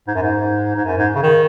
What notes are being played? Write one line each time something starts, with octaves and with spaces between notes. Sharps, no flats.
G#2
F#2
G#2
G#2
F#2
G#2
C#3
D#3